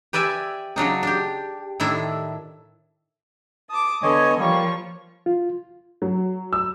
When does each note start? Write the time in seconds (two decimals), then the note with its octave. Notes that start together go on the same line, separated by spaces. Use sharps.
0.13 G4 B4 D5 E5 G#5
0.76 C#3 F#3 D4 D#4
1.03 D4 G4
1.80 A2 D#3 D4 E4
3.69 A5 D6 D#6
4.03 D3 B3 A4 C#5 D#5 G#5
4.39 F3 G3 A#3 C#5 C#6
5.26 F4
6.02 F#3
6.53 E6